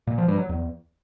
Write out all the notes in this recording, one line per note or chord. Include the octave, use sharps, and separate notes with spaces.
A#2
F3
G2
F#3
E2